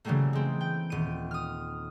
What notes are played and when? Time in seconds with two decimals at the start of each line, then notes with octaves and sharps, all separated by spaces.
0.05 C#3 E3 F#3 G3 A3 A#3
0.33 G#3 C4
0.61 G5
0.90 D#1 D#7
1.31 D#6 F6